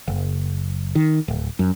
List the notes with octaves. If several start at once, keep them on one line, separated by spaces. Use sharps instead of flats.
F#1
D#3
D1
F#2